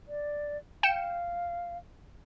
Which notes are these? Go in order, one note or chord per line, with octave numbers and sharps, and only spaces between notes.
D5
F5 G5 C#7 E7